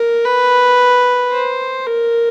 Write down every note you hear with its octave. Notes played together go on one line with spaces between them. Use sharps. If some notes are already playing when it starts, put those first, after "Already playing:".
Already playing: A#4
B4
C5
A#4